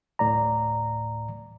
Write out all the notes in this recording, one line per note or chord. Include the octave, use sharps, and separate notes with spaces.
D2 A2 D5 A#5